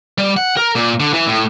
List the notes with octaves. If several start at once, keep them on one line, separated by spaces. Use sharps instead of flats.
G3
F#5
A#4
A#2
D3
E3
A2